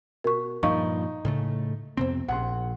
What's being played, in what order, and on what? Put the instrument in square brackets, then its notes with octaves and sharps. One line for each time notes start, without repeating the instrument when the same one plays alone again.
[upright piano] B2 [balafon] A#4 C#6
[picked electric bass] G2 A#2 F3 [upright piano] D#4 [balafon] F5 C#6
[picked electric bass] A2 C#3 A3
[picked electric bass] F2 C3 C4 [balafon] B3 C5
[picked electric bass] A#1 [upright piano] F#5 C6